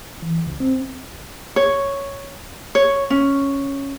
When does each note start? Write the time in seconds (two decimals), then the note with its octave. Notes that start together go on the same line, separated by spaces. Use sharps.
0.22 E3
0.47 C#2
0.60 C4
1.56 C#5
2.75 C#5
3.10 C#4